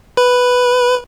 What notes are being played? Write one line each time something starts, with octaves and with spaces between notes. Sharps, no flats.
B4